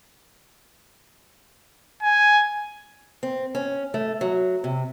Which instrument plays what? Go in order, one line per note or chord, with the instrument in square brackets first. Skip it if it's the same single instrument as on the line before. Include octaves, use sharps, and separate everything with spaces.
[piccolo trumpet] G#5
[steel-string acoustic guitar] C4
C#4
A3
F#3
C3